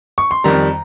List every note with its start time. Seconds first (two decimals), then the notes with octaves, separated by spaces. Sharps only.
0.18 C#6
0.31 C6
0.44 F2 D#3 G3 A#5